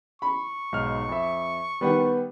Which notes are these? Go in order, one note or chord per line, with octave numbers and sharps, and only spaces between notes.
B5 C#6
B1 G#2 F6
F2 E5
D#3 G3 B3 B4 F#5